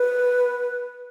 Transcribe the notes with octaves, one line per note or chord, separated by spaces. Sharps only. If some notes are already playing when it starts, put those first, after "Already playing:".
Already playing: B4